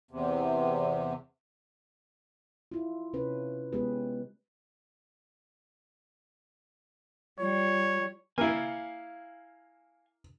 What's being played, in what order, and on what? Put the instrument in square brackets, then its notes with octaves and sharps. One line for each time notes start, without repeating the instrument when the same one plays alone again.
[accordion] E2 C3
[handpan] E4 F4
C3 C#4 B4
G#3 B3 G4 G#4 B4
[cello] G3 [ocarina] F4 [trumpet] C#5
[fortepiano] A#3 E4 [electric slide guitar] F5 G#5